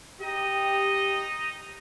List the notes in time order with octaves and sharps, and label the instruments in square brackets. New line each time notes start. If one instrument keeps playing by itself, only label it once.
[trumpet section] D#4 D#5 [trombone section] G4